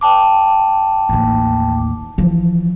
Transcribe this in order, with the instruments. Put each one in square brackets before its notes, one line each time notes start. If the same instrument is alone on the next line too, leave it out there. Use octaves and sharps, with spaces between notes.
[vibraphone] G5 A5 D6
[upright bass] A1 D#2
E3 F3